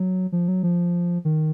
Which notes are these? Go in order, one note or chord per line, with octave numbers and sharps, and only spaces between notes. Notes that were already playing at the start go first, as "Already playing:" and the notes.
Already playing: F#3
F3
F#3
F3
D#3